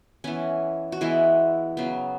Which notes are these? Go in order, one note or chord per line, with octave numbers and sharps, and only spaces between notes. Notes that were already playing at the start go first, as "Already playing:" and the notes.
E3 B3 C#4
F#4
E3 G#3 B3 E4
C#3 F#3 B3